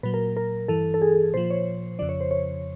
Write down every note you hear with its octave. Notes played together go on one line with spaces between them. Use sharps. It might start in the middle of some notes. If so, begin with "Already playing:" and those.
A#2 F#3 B4
A#4
A#4
G2 E3 A4
A4
G#4
A#2 F3 C5
C#5
F2 C#3 F3 D5
C#5
C5
C#5